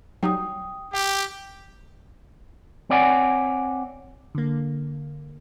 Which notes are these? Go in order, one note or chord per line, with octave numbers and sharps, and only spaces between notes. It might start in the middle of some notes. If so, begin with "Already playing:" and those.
F#3 G3 D#4 G5 D#6
G4 G5
C4 C#5 D5 F#5 G#5
D3 A#3